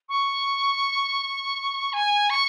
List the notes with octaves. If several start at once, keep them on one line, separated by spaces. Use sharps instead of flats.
C#6
G#5
C#6